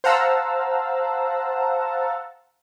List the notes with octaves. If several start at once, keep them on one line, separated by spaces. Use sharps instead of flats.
C5 F5 F#5 A5 A#5 E6